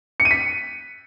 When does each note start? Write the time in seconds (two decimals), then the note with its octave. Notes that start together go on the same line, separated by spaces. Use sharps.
0.20 C#7
0.25 D#7
0.31 B6